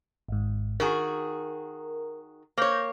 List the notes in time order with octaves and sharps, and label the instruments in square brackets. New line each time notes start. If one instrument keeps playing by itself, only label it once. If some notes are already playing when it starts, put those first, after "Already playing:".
[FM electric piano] G#1 G#2
[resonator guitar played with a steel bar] D#3 F#4 G#4 [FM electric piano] A#4
[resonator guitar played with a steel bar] A#3 C#5 [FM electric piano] C5 G6 A#6